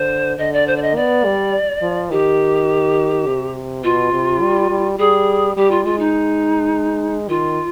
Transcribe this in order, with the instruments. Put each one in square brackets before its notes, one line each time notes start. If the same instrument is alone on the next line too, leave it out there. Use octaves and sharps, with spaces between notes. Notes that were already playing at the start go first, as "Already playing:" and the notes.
Already playing: [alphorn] D3 [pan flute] C5
[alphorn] D3 [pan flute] D#5
[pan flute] D5
C5
D5
D#5
[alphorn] B3 [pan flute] D5
[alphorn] G3
F3
[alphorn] D#3 [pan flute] G4
[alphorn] C3
[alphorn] B2 [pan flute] F4
[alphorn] C3
G3
G3
[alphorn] G3 [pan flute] G#4
[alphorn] G3 [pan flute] G4
[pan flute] F4
[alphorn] G#3 [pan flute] F4
[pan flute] D#4
[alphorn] D#3 [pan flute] F4